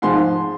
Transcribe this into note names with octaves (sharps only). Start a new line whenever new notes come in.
G#2 F3 G#3 C6